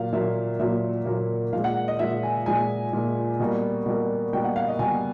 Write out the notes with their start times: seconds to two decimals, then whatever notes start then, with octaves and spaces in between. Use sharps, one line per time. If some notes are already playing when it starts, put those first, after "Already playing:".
Already playing: A#2 F#3 A#3 F5
0.13 A#2 F#3 A#3 E5
0.60 A#2 F#3 A#3 E5
1.06 A#2 F#3 A#3
1.53 A#2 F3 G#3 F5
1.64 F#5
1.88 D#5
1.99 A#2 F3 G#3 E5
2.23 G#5
2.46 A#2 F3 G#3 G#5
2.93 A#2 F3 G#3
3.40 B2 G3 A#3
3.86 B2 G3 A#3
4.33 B2 G3 A#3 G5
4.44 F#5
4.56 F5
4.68 D#5
4.79 B2 G3 A#3 G#5